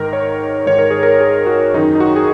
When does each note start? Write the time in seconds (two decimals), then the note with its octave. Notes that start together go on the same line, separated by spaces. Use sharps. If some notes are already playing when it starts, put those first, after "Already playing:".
Already playing: G#2 D#3 A#4
0.13 C#5
0.66 G#2 D#3 C#5
0.78 A#4
0.91 G#4
1.03 A#4
1.20 G#4
1.46 F#4
1.74 F#2 D#4
1.78 D#3
1.95 D#4
2.00 F#4
2.16 G#4